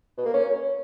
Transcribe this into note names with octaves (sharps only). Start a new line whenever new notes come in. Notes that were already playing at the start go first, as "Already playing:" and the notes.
B2
A#3
C#4